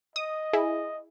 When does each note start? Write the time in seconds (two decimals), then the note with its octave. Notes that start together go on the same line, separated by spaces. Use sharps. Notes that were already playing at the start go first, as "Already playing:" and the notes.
0.16 D#5 D#6
0.53 E4 G#4